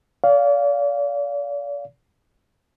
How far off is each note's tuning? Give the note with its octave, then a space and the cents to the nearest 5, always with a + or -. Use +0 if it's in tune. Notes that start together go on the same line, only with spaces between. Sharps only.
D5 -40 F5 +0